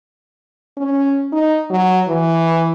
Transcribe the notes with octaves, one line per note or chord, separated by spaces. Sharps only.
C#4
D#4
F#3
E3